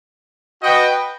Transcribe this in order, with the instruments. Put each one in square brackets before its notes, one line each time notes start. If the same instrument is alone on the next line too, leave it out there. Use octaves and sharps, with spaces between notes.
[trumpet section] F#4 B4 D#5 G5